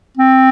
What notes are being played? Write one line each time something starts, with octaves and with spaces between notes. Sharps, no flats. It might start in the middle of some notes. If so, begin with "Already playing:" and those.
C4